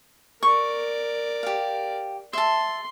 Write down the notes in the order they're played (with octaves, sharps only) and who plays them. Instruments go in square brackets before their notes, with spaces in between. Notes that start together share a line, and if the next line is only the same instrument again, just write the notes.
[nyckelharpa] A#4 D5 [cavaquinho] C#6
[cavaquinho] G4 F5
[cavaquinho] E5 A5 [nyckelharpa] C6